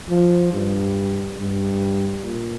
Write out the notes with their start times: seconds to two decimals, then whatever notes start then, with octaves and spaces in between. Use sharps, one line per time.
0.09 F3
0.52 G2
1.38 G2
2.23 A#2